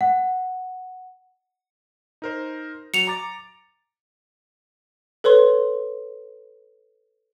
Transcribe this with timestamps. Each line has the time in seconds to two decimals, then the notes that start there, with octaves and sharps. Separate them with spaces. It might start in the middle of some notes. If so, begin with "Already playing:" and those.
0.01 F#5
2.22 D#4 A#4 C5
2.94 F#3 C#7 F7
3.07 A#5 D6 A6
5.24 A4 B4 C#5 C6